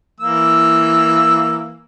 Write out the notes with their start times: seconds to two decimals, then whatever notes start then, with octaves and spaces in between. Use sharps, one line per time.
0.20 E3 A#3 E6